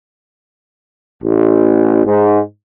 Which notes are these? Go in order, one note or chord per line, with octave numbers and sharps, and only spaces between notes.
A1
G#2